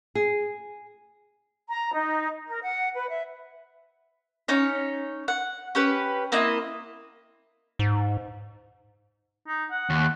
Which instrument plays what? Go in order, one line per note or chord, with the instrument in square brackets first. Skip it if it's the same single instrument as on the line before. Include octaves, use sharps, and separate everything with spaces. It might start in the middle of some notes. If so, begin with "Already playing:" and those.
[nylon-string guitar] G#4
[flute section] A#5
D#4
A#4
F#5
B4
E5
[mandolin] C#4 D#4 C#5
F#5
C#4 G4 B4
A#3 C4 E4 D#5
[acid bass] G#2
[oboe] D#4
F#5
[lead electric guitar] D#2